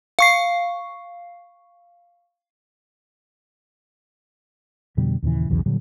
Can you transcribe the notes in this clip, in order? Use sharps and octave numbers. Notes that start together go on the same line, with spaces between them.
F5 C#6 C7
F2 B2 D3 G3
D#2 A#2 C#3 E3
B1 E2 C#3 E3
A#2 D3 F#3 G3